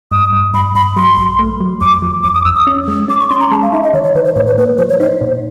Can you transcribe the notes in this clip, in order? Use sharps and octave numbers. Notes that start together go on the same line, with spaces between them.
G2 D#6
G2
G2 B5
G2 B5
F#3 C6
A#1
A3
F#3
F2 D6
F3
F2 D6
D#6
F2 E6
D#6
C#4
G#3
C#4 D6
C#6
C#4 C6
A#5
G#3 A5
F5
D#4 E5
D#5
D#3 C#5
C#5
D#3 B4
C5
A2 C#5
B4
A#3 B4
F3 C5
C#5
D#4 C5
A#2